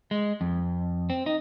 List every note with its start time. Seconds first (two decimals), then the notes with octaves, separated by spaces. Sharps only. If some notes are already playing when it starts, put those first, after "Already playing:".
0.11 G#3
0.41 F2
1.10 C4
1.26 D#4